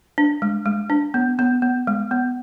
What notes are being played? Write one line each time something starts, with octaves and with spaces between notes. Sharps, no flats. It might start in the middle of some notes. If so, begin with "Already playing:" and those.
D4
G#3
G#3
D4
B3
B3
B3
G#3
B3